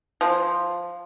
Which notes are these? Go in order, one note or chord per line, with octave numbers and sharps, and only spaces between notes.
F3